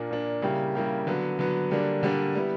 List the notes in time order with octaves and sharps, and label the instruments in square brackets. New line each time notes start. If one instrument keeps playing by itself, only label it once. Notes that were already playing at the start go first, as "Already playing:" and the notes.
Already playing: [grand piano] A#2 A#3 D4
A#2 A#3 D4
C#3 G3 A#3 E4 G4
C#3 G3 A#3 E4 G4
D3 F#3 B3
D3 F#3 B3
D3 G3 A#3 D4
D3 G3 A#3 D4
G3 B3 E4